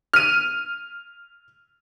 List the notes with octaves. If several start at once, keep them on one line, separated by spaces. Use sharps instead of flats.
F6 D#7